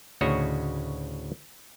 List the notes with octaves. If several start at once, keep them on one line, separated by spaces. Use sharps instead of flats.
D2 A2 C#3 F#4 C#5 D#5